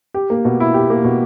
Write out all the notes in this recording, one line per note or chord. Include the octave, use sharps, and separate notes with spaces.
G4
A#3
B2
E4
G4
A#3
B2